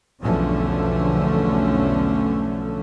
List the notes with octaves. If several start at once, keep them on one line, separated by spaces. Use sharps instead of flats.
B1 E2 D3 F3 A3 C#4